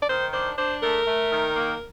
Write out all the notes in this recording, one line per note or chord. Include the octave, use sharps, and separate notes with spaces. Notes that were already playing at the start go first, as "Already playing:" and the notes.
D5
D#3 C5
D4 C5
D4 C5
A3 A#4
A3
D#3
A#3